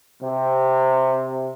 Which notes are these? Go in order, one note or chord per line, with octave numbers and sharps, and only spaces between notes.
C3